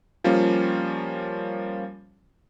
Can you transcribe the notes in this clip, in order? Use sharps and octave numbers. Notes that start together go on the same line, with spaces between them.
F3 G3 A#3 C#4 F4